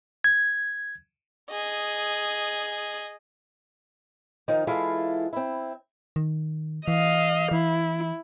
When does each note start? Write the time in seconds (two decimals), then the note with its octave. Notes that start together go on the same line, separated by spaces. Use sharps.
0.24 G#6
1.50 G#4 D#5
4.48 D#3 F3 D#4
4.67 E3 G#3 E4 F4 A4 F5
5.33 C4 E4
6.16 D#3
6.88 E3 D#5 F5
7.51 E3 E4